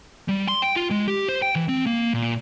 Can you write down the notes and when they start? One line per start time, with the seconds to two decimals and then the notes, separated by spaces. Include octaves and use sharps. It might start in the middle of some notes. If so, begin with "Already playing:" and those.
0.28 G3
0.48 C6
0.62 G5
0.76 F4
0.90 G#3
1.08 G4
1.29 C5
1.42 G5
1.56 E3
1.69 C4
1.86 A#3
2.14 A#2